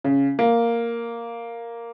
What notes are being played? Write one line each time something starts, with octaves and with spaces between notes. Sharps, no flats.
C#3
A#3